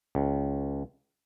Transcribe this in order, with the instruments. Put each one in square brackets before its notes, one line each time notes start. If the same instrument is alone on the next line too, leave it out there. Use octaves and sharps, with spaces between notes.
[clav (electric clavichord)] C#2